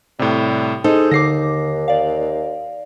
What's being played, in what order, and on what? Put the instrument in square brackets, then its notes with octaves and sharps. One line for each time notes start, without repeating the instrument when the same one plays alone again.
[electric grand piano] A2 C3 [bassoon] G3
[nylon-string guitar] D#4 [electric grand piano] G#4 A4 [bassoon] C5
[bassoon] D#2 [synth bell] D3 D6 [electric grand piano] A#6 C7
[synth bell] D5 F5